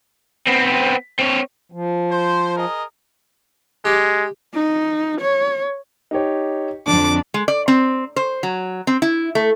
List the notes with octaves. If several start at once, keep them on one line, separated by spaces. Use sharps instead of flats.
B3 C4
C4 C#5
F3
C5
G#4 A#4 D#5
G#3 G4
D#4
C#5
D#4 G4 C#5
F2 D3 D4 D5 D6
G#3
D5
C4
C5
F#3
C4
E4
A3